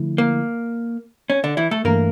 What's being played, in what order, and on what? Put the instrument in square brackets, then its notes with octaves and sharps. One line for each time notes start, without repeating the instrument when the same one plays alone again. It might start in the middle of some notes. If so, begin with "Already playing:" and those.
Already playing: [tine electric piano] D3 F3 A3 E4
[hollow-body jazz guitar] A#3
C#4
D3 D4
E3 E4
A3 A4
[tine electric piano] G2 E3 A3 [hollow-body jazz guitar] A#3 A#4